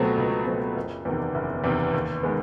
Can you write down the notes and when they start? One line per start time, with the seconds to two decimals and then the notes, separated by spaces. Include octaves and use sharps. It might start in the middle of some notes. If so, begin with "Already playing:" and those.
Already playing: C#2 B2 F#3 A3 C4
0.18 C#2
0.47 B2 F#3 A3 C4
0.76 F#1
1.05 E2 C3 D#3
1.35 F#1
1.64 E2 C3 D#3
1.93 D#2
2.23 D#3 G#3 B3